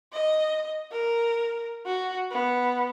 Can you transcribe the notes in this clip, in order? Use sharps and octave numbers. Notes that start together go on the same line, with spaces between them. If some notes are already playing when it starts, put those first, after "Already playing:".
D#5
A#4
F#4
B3